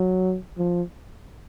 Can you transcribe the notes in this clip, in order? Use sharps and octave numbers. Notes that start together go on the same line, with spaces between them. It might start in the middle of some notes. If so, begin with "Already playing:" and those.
Already playing: F#3
F3